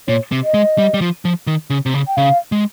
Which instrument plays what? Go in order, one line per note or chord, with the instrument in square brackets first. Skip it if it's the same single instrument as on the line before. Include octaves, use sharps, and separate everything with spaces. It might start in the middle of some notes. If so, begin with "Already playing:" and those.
[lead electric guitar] A#2 [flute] C#5
[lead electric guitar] C3
[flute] D#5
[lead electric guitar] G#3
G3
G3
F3
F3
D#3
C#3
C3
C#3
[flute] G5
[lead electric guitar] C#3 [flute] F5
[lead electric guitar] G#3